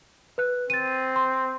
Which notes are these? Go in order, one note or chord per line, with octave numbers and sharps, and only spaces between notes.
B4 F#6
C4 A6 D#7
C6